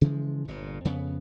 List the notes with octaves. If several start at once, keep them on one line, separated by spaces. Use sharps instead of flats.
C#3 E3 F3 G#3
G1 A#2
F2 C#3 B3